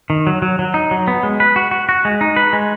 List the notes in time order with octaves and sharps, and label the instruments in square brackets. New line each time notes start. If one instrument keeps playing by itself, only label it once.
[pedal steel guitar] D#3
F#3
F#3
F#3
D#4
F#3
B3
G#3
B4
F#4
F#4
F#4
G#3
D#4
B4
G#3